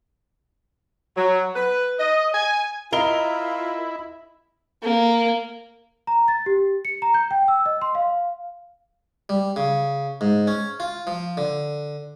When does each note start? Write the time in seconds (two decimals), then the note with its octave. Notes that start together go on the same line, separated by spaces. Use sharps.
1.17 F#3
1.56 B4
2.00 D#5
2.34 G#5
2.92 E4 F4 A#4 D#5 G7
4.82 A#3
6.07 A#5
6.28 A6
6.46 G4
6.85 C#7
7.02 A#5
7.14 G6
7.31 G5
7.48 E6
7.66 D#5
7.82 C6
7.95 F5
9.29 G3
9.56 C#3
10.21 G#2
10.47 C#4
10.80 F4
11.07 F3
11.37 D3